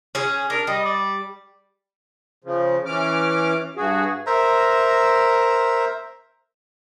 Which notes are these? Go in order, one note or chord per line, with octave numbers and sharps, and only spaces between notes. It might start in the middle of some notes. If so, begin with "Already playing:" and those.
C#4 G#4
D4 A#4
G3 D#5
D5
C#3 F3
E3 C#4 D6 F6
G2 F#4 G#4
A#4 C5 E5 A#5